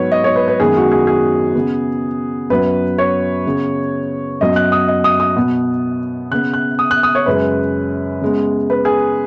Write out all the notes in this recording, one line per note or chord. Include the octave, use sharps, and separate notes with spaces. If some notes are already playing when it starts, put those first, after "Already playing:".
Already playing: G#2 F#3 B3 B4 C#5
D#5
C#5
B4
B4
F#2 D#3 G#3 B3 G#4
F#4
G#4
G#4
C#3 B3
F#2 F#3 B3 B4
C#5
C#3 B3
F#2 F#3 B3 D#5
F#6
D#6
D#5
D#6
D#6
B2 B3
C#3 B3 F#6
F#6
D#6
F#6
D#6
C#5
F#2 C#3 G#3 C#4 B4
C#3 G#3 B3
B4
G#4